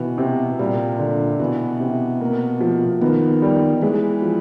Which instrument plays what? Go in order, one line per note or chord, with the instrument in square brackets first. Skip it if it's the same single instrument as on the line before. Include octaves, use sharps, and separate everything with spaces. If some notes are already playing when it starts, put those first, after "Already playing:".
Already playing: [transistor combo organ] B2 [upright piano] E3
[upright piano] C3
[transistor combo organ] A#2 [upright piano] G3
[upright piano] D3
[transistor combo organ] B2 [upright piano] E3
[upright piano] C3
A#3
F3
[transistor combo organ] D#3 [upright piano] B3
[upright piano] G3
[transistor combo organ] E3 [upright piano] G#3
[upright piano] F3